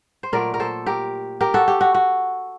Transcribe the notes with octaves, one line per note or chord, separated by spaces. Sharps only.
C5
A#2 F#3 A3 A#4 D5
A#4
A4 C5
G4 A#4
G4 A#4
F#4 A4
G4
F#4
F#4